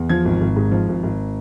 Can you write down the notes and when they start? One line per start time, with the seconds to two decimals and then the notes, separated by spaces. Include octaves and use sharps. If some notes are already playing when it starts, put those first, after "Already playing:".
Already playing: E2
0.09 F3 G#6
0.25 G#1
0.41 G#1
0.56 G#2
0.71 F3
0.88 G#1
1.03 G#1